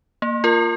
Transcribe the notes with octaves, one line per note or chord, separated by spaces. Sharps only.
A#3
F4 A#4